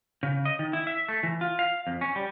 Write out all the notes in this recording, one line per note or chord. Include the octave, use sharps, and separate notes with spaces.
C#3
D#5
D#3
E4
E5
A3
E3
F4
F5
F2
C#4
G3